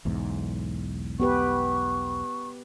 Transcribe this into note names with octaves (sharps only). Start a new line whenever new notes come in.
B1 E2 G#2
B3 G4 B4 C#6